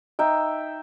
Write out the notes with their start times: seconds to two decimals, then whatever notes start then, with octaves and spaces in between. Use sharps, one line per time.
0.19 D#4 E5 G5